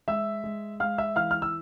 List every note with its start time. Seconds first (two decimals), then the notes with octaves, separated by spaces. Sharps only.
0.08 G#3 E5 E6
0.44 G#3
0.80 G#3 F5 F6
0.98 E5 E6
1.16 E3 F5 F6
1.31 F6
1.42 E6